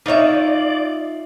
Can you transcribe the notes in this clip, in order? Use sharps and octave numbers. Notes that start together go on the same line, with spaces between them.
D#4 F4 C#5 D5 E5